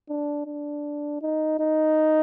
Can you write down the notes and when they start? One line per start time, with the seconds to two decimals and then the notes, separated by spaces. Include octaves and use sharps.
0.09 D4
0.47 D4
1.22 D#4
1.60 D#4